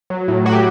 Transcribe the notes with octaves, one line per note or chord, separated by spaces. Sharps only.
F#3
A2
F#3 F#4
G4